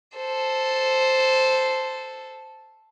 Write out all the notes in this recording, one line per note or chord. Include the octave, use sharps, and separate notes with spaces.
A4 C5